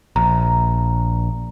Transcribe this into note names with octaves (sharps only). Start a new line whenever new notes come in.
A#1 A#5